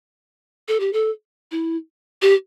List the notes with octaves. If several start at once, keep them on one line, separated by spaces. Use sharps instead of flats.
A4
G4
A4
E4
G4